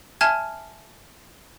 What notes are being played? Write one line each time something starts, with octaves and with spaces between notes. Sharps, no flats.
E5 G#5 A5 F6 G#6